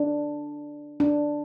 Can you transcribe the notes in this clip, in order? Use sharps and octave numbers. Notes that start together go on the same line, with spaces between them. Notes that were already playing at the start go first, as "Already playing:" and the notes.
Already playing: D4
D4